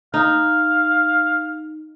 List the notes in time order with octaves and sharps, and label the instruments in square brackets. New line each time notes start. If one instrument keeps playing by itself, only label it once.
[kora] D#4 [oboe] F5